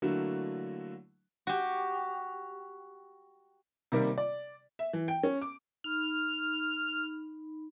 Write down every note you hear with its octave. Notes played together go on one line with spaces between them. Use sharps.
D3 F#3 A3 A#3 E4 F#4
F#4 G4
C3 D#3 G3 A#3
D5
E5
E3
G5
C#4
D6
D#4 B5 F6